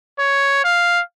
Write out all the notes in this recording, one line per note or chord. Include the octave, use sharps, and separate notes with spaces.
C#5
F5